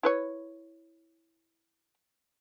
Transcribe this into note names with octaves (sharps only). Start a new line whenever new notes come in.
E4 B4 C#5